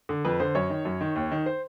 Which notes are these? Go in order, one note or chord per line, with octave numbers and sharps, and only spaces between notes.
D3
F2 B4
D3 C5
F#2 C#5
D#3
F#2
D#3
D#2
D#3
C5